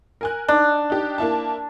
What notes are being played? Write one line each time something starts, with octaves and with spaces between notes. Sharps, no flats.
A#4 G#5 F#6
D4 D#4
D#4 G4
A#3 E4 A5